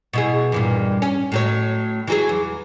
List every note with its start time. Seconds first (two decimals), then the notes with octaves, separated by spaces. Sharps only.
0.13 B2 E4 G#4
0.52 E2 G2 A#2
1.02 C#4
1.32 A2 F#3 C#5
2.08 E3 F#3 G#4
2.29 E2